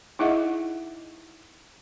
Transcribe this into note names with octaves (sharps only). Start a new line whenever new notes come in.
D#4 E4 G#4 D#5 E5 F#5